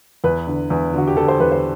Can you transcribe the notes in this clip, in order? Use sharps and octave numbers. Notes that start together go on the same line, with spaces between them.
E2 B4
D3
E2
D3 F#4
G4
D3 A4
C5
E2 B4
C5